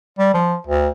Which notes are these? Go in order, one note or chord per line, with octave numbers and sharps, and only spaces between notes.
G3
F3
D2